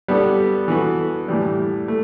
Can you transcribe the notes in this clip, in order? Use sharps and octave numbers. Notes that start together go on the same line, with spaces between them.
G3 B3 D4 A4
E3 B3 F#4 A4
A2 E3 G3
A3